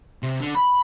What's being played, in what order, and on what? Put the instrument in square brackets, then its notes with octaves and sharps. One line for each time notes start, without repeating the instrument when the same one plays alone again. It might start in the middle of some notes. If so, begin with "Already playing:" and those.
[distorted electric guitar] C3
D3
B5